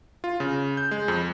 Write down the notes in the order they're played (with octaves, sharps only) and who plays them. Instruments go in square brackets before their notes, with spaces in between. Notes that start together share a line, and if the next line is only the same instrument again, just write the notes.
[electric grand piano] F4
C#3
G6
G#3
F2